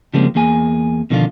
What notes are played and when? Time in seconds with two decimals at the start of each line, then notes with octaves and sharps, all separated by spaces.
0.14 C#3 F3 G3 G#3 A#3 C4
0.35 E2 A#3 G#4 G#5
1.10 B2 D3 D#3 F3 D4 F4